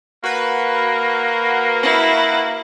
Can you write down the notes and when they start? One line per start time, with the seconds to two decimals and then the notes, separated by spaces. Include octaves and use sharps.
0.24 A#3 F#4 B4
1.83 E4